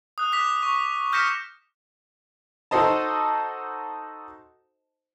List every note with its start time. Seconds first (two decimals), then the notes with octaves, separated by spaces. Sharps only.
0.18 D#6 F#6
0.32 D6 D#6 F#6 B6 F7
0.63 C#6
1.13 F6 G6 A#6 B6 C#7 E7
2.71 D#4 F#4 A4 C5 D#5 A5